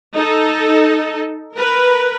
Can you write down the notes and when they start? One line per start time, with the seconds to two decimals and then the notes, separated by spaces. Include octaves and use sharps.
0.14 D#4 A4
1.55 A#4 B4